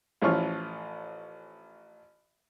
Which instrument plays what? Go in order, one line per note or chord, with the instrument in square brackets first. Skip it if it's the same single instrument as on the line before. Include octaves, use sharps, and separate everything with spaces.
[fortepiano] A1 E3 F3 C#4 F4 C#6